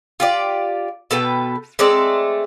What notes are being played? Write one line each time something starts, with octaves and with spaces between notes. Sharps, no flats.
F4 G4 D5
B2 A4 B4 G5
G#3 A3 C4 D5